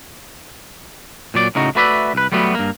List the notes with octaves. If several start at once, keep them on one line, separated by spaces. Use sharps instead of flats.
A#2 F#3 D5
A2 C#3 D#4 F#4
A3 F#4 B4 D5 E5
C2 B4
F#3 G3 A3 B3 F#4
G2 A#3